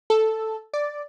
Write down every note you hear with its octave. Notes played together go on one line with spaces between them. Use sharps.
A4
D5